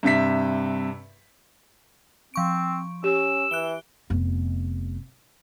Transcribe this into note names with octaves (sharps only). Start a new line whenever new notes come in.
G2 C3 E5 B6
F3 C4 C#6 D7
C#4 G4 E6
E3 F#6 D7 G7
F1 B3